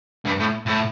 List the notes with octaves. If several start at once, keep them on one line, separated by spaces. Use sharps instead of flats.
G2
A2
A2